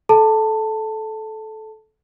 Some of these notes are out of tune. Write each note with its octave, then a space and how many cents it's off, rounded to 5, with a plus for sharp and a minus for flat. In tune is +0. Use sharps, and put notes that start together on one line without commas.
A4 -20 A5 +15